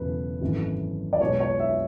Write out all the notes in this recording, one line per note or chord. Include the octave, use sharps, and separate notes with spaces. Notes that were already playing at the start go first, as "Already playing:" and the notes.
Already playing: E1 E2 C#3 F#3 A3 B4
G#1 F#2 E3 A3
D5
B1 B2 G#3 C#5
C#5
E5